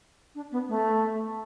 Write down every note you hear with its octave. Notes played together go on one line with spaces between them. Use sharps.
D4
B3
A3